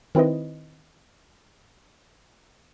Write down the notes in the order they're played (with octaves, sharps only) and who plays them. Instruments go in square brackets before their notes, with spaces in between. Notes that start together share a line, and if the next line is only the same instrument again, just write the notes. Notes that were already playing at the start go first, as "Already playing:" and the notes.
[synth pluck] D#3 C4 E4 B4 D#5